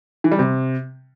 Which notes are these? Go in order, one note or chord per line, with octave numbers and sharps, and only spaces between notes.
E3
G3
C3